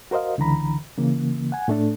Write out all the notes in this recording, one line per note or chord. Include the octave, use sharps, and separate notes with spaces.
F#4 A#4 C5 D#5 F5
C#2 D3 E3 A#5 B5
C#3 E3 A#3
F#5 G#5
A2 A3 D4 A4